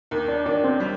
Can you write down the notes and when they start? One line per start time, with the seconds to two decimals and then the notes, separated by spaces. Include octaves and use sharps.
0.11 D#2
0.28 D4
0.46 D#2 D4
0.64 C4
0.80 G3